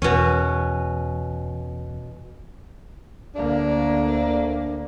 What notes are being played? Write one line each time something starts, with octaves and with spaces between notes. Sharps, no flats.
E2 B2 C#4
D2 A#3 D4